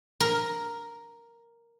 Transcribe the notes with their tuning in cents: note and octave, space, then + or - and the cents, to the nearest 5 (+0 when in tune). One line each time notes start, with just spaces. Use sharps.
A#4 +0